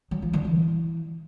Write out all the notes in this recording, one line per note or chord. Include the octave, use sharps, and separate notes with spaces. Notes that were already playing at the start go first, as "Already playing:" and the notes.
F#3
F3
D3
E3